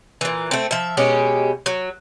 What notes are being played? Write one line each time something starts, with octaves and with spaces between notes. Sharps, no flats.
A#2 E3
A3 C4
F3 E5
B2 G#3 C#4 G4
F#3